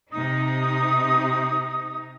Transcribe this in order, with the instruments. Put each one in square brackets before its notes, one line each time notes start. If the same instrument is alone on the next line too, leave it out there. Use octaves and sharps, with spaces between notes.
[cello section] C3 D#4 [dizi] D#6